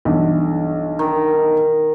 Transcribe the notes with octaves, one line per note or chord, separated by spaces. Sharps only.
B1 G2 E3
D#3